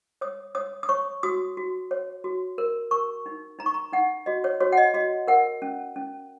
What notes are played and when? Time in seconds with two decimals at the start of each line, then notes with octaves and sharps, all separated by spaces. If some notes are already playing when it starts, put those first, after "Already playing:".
0.21 C#5 D#6
0.55 C#5 D#6
0.83 D#6
0.89 C#5 C#6
1.23 F#4 D#6
1.57 F#4
1.91 C#5
2.24 F#4
2.58 A#4
2.91 A#4 C#6
3.26 D#4
3.59 D#4 A#5
3.66 C#6
3.74 A#5
3.93 D#4 F#5
4.26 F#4 D#5
4.44 C#5
4.60 F#4 C#5
4.72 F#5
4.77 D#5
4.94 F#4 D#5
5.28 A#4 F#5
5.62 C#4
5.96 C#4